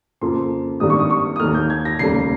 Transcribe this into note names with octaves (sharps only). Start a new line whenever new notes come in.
F2 C#3 F3 A#3 C6
G#1 G2 D#3 G3 A#3 D#6
C#6
D#6
C#6
D#6
D#2 D#3 A#3 F6
G6
G#6
A#6
F1 D#2 C#3 G3 A#3 C7